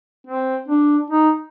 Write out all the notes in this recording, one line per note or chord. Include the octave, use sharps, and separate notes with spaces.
C4
D4
D#4